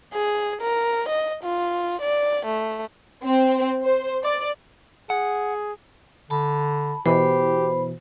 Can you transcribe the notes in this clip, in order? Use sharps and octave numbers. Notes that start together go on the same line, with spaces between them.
G#4
A#4
D#5
F4
D5
A3
C4
C5
D5
G#4 F#5
D3 A5 B5
B2 E3 G4 C5 B5